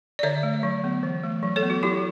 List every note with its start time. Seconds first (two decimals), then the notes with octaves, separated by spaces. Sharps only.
0.19 D5
0.23 D3 C#5 E5
0.43 A3
0.63 F#3
0.84 B3
1.03 E3
1.23 A3
1.43 F#3
1.56 A4 C#5
1.63 B3
1.70 F#4
1.83 F#3 E4 G4